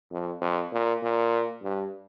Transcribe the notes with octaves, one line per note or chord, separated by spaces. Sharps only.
F2
F2
A#2
A#2
G2